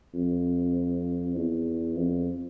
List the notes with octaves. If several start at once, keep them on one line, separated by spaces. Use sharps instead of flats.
F2
E2
F2